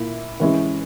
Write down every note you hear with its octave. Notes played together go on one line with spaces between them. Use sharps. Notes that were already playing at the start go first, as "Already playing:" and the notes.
Already playing: A#2 A#3 E4
E3 G#3 C#4 E4 G#4